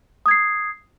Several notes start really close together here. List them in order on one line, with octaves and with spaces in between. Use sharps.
D#6 G#6 C7